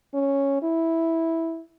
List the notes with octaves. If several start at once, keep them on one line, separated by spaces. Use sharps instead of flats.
C#4
E4